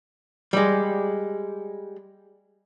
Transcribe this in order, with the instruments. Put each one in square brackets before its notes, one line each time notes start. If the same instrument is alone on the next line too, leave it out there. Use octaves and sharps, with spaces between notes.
[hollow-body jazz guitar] G3 G#3